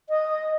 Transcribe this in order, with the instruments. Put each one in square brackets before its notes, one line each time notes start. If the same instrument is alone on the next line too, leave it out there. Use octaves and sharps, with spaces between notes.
[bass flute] D#5